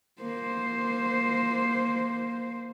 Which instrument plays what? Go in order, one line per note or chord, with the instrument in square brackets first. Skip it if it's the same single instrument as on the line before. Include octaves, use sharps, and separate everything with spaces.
[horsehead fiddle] A#3 C5